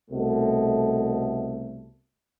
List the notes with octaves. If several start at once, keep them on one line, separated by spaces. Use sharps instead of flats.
C2 B2 A3